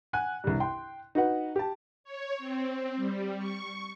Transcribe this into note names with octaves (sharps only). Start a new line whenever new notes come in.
F#5 G#5 F#6
C2 G2
G5 C6
D#4 F#4 B4 F#5
G4 A5
C#5
C4
G3
C#6